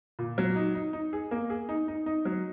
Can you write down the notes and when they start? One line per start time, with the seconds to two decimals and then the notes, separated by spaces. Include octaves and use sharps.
0.19 A#2
0.38 F#3
0.56 D#4
0.75 D#4
0.93 D#4
1.13 G#4
1.31 A#3
1.50 G#4
1.69 D#4
1.88 D#4
2.06 D#4
2.25 F#3